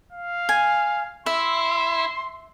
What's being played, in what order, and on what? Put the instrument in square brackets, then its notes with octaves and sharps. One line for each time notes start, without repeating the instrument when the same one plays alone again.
[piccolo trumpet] F5
[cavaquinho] G#5
[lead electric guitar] E4 [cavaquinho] E5 [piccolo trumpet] C6